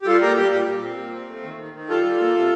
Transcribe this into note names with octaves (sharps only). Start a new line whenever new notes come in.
G4
G3 F4 A4
A#2 G4 A#4
G3 G4
A#2 G4
A#2
C4
A#2
C4
A3
D#3
D#3
D#3
G3 F4 A4
G3
A#3
C3